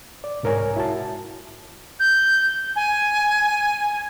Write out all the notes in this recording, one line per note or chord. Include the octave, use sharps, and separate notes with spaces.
D5
C2 G#2 A#4 C#5 G#5
E4 F#4 A5
G6
G#5